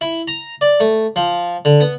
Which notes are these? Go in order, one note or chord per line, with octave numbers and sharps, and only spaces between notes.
E4
A#5
D5
A3
F3
D3
B3